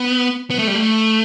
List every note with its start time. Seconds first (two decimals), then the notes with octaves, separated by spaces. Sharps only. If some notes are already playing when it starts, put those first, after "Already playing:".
Already playing: B3
0.50 B3
0.59 A3
0.68 G3
0.75 A3